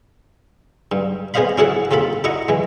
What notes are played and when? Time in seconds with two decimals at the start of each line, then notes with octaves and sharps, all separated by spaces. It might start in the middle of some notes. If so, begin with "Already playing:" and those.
0.92 G2
1.34 B3 G#4 C5 D#5 F5 B5
1.58 C#4 E4 F#4 G#4 A4 F#5
1.91 D#2 C3 F4 A4 B5
2.24 E4 F#4 D#5 A#5 C#6
2.48 E3 G#3